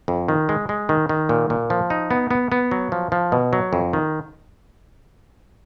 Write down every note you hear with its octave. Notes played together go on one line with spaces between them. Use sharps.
F2
D#3
G#3
G#3
D#3
D#3
A#2
A#2
F3
D#4
B3
B3
B3
F#3
F3
F3
B2
F#3
F2
D#3